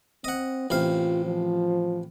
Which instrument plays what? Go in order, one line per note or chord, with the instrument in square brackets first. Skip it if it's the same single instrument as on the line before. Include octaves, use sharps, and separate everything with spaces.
[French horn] C4 [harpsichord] D#5 F#5
[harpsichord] A1 C3 F5 [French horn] F4
[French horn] F3